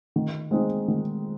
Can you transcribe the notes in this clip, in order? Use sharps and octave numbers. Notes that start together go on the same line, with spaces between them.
D#3
G#3 C4 D#4
D#3